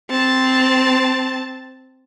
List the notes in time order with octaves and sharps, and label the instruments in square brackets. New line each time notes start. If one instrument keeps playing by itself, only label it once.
[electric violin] C4 A5